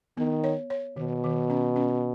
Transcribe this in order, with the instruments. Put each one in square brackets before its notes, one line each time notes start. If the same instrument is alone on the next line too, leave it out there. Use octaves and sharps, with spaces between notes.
[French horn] D#3 [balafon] B3
[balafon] C#5
C#5
[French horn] B2 [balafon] D#3
[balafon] D#3
C#4
C#4